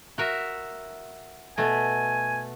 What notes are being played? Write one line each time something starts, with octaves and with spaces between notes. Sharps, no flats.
F#4 A#4 E5
B2 A3 G#5